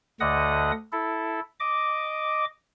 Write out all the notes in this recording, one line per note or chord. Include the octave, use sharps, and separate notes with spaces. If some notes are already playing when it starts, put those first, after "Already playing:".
D2 D3 D#5 F#5 D#6
E4 A4
D#5 D6